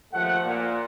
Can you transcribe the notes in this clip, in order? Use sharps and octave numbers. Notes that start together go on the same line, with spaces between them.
D#2 F3 A3 A4 F#5
A#2